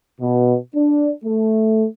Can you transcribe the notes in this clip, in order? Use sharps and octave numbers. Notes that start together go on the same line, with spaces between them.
B2
D4
A3